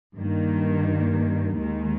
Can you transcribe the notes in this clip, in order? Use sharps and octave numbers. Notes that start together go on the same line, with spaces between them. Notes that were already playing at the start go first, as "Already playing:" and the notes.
G2 D#3 A#3
D#2 D#3 G#3